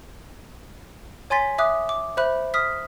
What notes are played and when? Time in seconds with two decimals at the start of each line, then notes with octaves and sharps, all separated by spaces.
1.30 C#5 G#5 C6 A6 B6
1.58 E5 D6 D#6 F#6
1.89 D6
2.17 C5 E5 B5 F#6
2.54 D#6 F6 B6